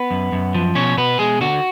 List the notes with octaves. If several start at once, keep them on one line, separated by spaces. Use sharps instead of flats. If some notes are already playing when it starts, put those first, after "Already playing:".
Already playing: B3 B4
F#2
F#2
F3
B2 C#4 C#5
B2 B3 B4
B2 G#3 G#4
D3 F#4